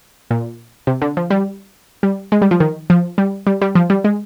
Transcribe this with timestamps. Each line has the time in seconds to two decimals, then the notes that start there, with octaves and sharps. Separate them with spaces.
0.31 A#2
0.87 C3
1.02 D3
1.17 F3
1.30 G3
2.03 G3
2.32 G#3
2.42 G3
2.51 F3
2.60 D#3
2.90 F3
3.18 G3
3.47 G3
3.62 G3
3.75 F3
3.90 G3
4.04 G#3